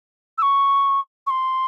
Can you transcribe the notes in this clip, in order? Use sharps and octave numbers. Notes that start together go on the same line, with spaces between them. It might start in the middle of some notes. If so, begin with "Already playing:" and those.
E6
C#6
C#6
C6